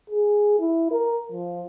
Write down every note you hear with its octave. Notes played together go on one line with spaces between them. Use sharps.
G#4
E4
A#4
F3